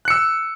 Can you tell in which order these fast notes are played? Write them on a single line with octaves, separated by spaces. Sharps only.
F#6 C#7 E6